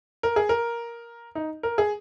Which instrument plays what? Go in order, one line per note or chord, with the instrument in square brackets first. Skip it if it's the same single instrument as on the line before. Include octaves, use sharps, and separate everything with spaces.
[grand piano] A#4
G#4
A#4
D#4
A#4
G#4